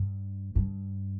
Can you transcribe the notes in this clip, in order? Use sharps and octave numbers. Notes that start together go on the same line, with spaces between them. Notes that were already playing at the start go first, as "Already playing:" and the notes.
Already playing: G2
G2